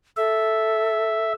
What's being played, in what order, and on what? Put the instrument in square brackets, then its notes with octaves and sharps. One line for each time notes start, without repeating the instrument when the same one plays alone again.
[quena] A4 [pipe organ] E5